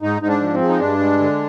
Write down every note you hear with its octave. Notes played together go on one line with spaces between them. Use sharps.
G#2 D#4
G#2 D#4
D4
F3
C4
G#3
D#4
G2 D4
G#3
D3